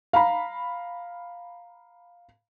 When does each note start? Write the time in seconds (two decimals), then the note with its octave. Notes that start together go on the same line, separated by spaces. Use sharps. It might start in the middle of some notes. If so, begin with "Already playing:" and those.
0.13 F5 A#5 B5